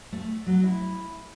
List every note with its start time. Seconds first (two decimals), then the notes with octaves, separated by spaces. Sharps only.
0.12 A3
0.47 F#3
0.63 E4